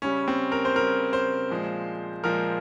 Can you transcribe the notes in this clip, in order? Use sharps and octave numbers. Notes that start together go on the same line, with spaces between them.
C#3 G3 C#4
C4
A#4
C5
C#3 G3 A#4
C5
A#2 F3 G#3
A#2 F3 G#3 A#4